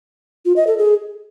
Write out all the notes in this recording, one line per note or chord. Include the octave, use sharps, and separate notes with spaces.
F4
D#5
A4
G#4